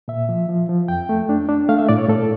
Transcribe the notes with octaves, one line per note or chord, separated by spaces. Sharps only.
A#2 E5
F3
F3
F3
F2 G5
A3
D4
D4
A3 F5
E5
A2 D5
C#5
A2 A4